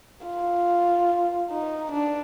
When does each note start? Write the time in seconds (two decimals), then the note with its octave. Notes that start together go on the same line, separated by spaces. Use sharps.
0.27 F4
1.51 D#4
1.92 D4